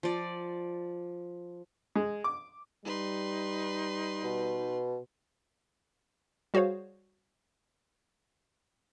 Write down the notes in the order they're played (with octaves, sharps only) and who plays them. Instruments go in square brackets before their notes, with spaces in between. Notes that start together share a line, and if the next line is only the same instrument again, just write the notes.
[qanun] F3 D5
[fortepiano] G#3
D6
[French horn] G3 [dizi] D#4 [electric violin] B4 C6
[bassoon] B2
[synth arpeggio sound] G3 F#4 G#4 C5 C#5 F5